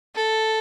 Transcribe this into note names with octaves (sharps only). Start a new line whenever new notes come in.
A4